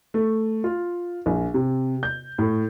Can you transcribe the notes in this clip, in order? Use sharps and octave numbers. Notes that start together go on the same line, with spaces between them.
A3
F4
A#1
C3
G6
A2